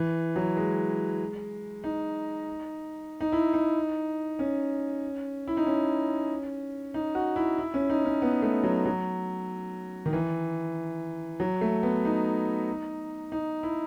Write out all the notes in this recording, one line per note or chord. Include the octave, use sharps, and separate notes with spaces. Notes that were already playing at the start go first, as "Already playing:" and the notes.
Already playing: E3
F#3
G#3
D#4
D#4
E4
D#4
C#4
E4
D#4
C#4
D#4
F#4
E4
E4
C#4
D#4
C#4
B3
A3
F#3
F#3
D#3
E3
F#3
A3
B3
D#4
D#4
E4